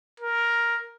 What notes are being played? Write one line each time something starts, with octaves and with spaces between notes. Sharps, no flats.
A#4